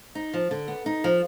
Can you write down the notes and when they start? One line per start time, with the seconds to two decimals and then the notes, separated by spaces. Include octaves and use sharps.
0.15 D#4
0.34 F3
0.51 D3
0.68 B3
0.86 D#4
1.04 F3